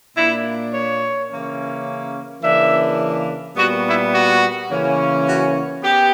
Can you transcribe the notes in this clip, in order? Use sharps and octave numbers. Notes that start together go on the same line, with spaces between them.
A#2 A#3 D4 E4
C#5
C#3 E3 A#3 C#4
C#3 E3 A#3 D4 E5
A#2 G3 B3 F#4
E4
F#4
C#3 E3 A#3 C#4
F#4
B3 G4